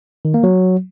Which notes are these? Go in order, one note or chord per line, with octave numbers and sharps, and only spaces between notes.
D#3
A#3
F#3